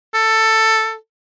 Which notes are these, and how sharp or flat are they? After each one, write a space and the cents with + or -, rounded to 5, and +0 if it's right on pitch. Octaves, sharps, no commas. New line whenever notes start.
A4 +10